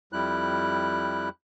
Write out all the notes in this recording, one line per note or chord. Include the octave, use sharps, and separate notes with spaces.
F2 G3 E4 F#6